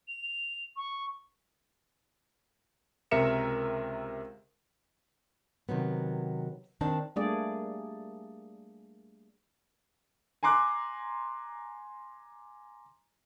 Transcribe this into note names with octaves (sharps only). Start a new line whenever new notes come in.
F7
C#6
C#2 C3 A#4 E5 C#7 E7
C3 D#3 F#3 B3
D#3 C4 D4 A5
G3 A3 A#3 D4 G#4 D5
G#5 A#5 C6 D6 F#6